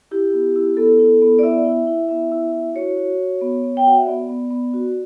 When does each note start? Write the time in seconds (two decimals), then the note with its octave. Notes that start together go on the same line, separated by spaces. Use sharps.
0.11 E4 G4
0.33 B3
0.56 E4
0.77 B3 A4
0.99 E4
1.22 B3
1.39 D5
1.43 E4 E5
1.65 E4
1.87 E4
2.09 B3 E5
2.32 E4
2.53 E4
2.75 F#4 C#5
2.97 F#4
3.19 F#4
3.41 B3
3.63 B3
3.77 G5
3.86 F#4 F#5
3.97 E5
4.07 B3 D5
4.29 B3
4.51 B3
4.74 F#4